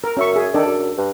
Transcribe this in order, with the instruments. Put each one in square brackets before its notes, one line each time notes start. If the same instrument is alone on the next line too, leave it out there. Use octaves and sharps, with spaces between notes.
[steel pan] A#4
[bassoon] F#2 [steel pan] C#4 E5 C#6
[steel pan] G#4 E5
[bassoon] D#3 [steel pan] D4 A4 D5
[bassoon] F#2
G2